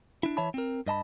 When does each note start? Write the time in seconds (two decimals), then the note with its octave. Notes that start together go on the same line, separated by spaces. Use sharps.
0.23 D4 E4
0.37 E3 C#5 E5 A5 B5
0.54 C4 A#4
0.86 G2 D#5 A5 B5